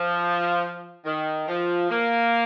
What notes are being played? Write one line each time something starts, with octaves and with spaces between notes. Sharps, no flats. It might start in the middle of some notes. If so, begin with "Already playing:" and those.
Already playing: F3
D#3
F3
A#3